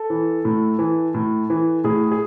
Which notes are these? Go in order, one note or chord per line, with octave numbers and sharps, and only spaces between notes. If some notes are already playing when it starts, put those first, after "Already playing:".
Already playing: A4
E3
A2
E3
A2
E3
A2 G#4
G#4